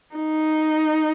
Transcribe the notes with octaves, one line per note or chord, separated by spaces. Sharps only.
D#4